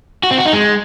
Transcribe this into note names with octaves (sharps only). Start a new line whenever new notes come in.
F#4
C4
F#4
D#4
G#3